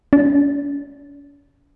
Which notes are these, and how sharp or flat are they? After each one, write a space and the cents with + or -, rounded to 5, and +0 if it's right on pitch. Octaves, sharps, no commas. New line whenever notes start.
C#4 +45